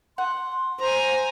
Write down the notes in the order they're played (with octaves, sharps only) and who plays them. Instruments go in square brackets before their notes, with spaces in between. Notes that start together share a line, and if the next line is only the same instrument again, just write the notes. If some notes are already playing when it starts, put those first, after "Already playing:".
[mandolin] F#5 [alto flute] C6
[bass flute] C5 [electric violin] G#5 A#5